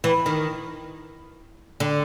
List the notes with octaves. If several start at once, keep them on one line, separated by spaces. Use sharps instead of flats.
E3
D#3
D3